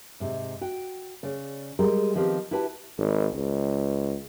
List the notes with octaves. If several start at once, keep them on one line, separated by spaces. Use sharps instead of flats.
G#2 C3
F#4 G5
C#3 D5
G3 G#3 G#4 A#4
D#3 F3 B3 C4 G4
E4 F#4 G4 B4 G#5 A5
G#1
C#2